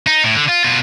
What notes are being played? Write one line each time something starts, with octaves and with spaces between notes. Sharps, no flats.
D#4
A2
D3
F4
B2 F4